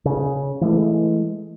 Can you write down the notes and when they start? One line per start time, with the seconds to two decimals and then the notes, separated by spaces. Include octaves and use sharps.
0.05 C#3
0.61 E3 G#3 A3